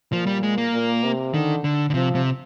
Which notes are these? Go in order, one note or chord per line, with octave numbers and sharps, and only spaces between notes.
A#2 F3
G3
G#3
A#3
A#2
C3
D3 D#3
D3
D3
C3 F3
C3